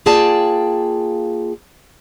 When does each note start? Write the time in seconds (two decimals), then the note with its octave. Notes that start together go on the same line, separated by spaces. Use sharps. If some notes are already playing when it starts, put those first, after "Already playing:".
0.06 A#3 F4 G#4 D5 G5 A5